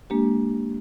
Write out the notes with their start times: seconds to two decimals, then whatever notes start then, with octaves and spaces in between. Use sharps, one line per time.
0.10 G#3 A#3 D4 G4